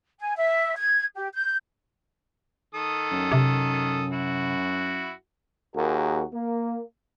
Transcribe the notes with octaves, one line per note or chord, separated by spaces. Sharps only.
G#5
E5
G#6
G4
G6
D#3 A4 D#6
F#2
C3
E4 F#4
D#2 F#4 G#4 A#4
A#3